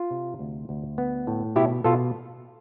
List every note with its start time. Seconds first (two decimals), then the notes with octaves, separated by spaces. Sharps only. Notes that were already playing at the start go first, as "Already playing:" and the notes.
Already playing: F4
0.11 C3
0.39 D2
0.69 D2
0.98 B3
1.27 A2
1.56 B2 E4 G4
1.84 B2 F4 A4